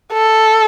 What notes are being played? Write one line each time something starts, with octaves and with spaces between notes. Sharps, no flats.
A4